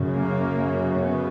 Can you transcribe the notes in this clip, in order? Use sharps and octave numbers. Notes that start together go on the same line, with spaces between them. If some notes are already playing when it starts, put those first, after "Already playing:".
Already playing: F#2 C#3
A#3
B3